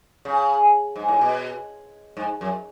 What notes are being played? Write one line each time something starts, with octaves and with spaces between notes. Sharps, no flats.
C#3
G#2
A2
B2
G#2
F#2